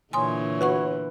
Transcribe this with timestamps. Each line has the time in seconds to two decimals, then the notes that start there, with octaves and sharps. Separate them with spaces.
0.13 A#2 D3 E3 C#5 G#5 C6 D#6
0.61 F#4 B4 F#5 C#6